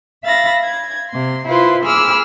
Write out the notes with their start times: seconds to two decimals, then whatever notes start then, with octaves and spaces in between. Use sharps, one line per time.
0.23 E5 F5 B5 A6 A#6
0.63 G#6
1.11 C3 C6
1.46 E4 F4 B4 C5 C6
1.84 G#4 B5 D6 E6 F6